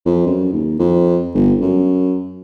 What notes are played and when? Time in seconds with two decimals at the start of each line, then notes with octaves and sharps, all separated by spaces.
0.06 F2
0.26 F#2
0.53 D#2
0.79 F2
1.34 G1
1.61 F#2